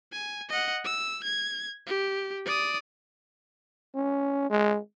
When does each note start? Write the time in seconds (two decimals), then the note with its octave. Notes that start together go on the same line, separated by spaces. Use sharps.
0.12 G#5
0.49 D#5 F#5
0.84 E6
1.24 G#6
1.87 G4
2.46 D5 D#6
3.95 C#4
4.50 G#3